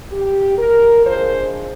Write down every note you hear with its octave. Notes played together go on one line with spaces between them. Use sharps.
G4
A#4
A#2 F3 G#3 D4 C5